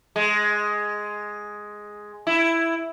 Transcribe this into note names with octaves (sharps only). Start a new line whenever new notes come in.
G#3
E4